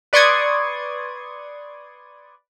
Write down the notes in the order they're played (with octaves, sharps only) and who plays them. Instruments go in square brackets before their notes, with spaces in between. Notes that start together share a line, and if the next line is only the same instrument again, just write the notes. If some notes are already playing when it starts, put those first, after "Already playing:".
[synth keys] B4 D5 C6 C#6 D#6 G#6